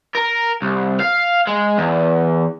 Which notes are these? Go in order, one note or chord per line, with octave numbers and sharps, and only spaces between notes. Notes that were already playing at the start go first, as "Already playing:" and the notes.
A#4
C2
F5
G#3
E2